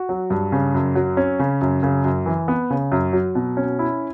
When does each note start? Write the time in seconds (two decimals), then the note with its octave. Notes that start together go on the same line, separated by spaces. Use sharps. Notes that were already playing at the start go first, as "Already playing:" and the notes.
Already playing: F#4
0.09 F#3
0.30 G2
0.52 C#3
0.74 F#2
0.95 F#3
1.17 C#4
1.39 C#3
1.61 F#2
1.83 C#3
2.05 F#2
2.26 E3
2.48 B3
2.70 C#3
2.92 F#2
3.13 F#3
3.35 B2
3.57 C#4
3.79 E4